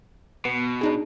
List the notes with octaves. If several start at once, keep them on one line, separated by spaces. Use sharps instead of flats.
B2 B3
D4 D#4 G#4